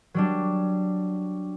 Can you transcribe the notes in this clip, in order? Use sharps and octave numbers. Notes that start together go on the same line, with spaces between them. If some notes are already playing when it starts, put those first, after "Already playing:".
F#3 G3 D4